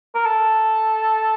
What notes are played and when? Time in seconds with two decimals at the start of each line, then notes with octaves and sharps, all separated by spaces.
0.14 A#4
0.26 A4